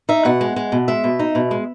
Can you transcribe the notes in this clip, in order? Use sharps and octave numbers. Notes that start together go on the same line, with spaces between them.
D#4 E5
B2 F#5
G#3
G#3
B2
G#3 E5
B2
D#4
B2
G#3